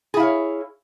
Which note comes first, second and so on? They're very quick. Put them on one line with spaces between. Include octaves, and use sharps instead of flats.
G#4 E4 F5 C#5